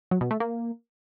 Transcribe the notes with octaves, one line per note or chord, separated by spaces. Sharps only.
F#3
B2
A3
A#3